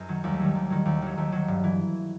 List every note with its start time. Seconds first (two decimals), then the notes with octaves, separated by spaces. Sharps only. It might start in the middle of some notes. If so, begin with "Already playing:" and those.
Already playing: F#2 D#4 A4 B4
0.09 D#3 F#3
0.24 D#2 G3
0.34 A3
0.40 D#3 F#3 G3
0.55 D#2
0.70 D#3 F#3
0.85 D#2
1.02 D#3 F#3
1.17 D#2 A3
1.32 D#3 F#3
1.48 G2
1.64 E3